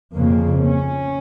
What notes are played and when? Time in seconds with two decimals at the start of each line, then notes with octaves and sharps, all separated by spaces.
0.14 F2 C#3 A#3
0.63 C#4